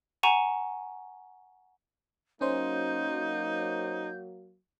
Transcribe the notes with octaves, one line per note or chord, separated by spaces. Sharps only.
F#5 G#5 A#5 C#6 D#7 E7
F#3 A#3 C#4 D#4 C5 G6